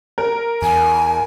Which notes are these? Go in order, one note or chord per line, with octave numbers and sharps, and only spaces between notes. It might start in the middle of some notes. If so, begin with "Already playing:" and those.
A#4
E2 G#5